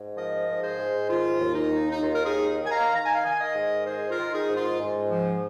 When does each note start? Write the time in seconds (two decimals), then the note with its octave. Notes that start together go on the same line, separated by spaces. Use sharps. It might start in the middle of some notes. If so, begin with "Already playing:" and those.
Already playing: G#2
0.17 F3 A#4 D#5
0.47 G#2
0.63 G#4 C5
0.79 G#2
1.10 D#3 F4
1.40 D#2
1.55 D#4
1.71 D#3
1.91 D#4
2.01 D#2 F4
2.14 A#4
2.24 D#4 G#4
2.32 D#3
2.64 D#3 G#5
2.70 F5 A#5
2.94 D#3 A#5
3.05 G#5
3.15 F5
3.25 D#3 D#5 G#5
3.40 A#4 D#5
3.55 G#2
3.86 D#3 G#4 C5
4.10 F4 A#4
4.17 D#3
4.33 D#4 G#4
4.48 G#2
4.56 F4
4.79 G#2
5.10 F3